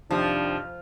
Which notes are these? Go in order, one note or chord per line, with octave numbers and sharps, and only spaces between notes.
F2 C3 D#3 F3 D4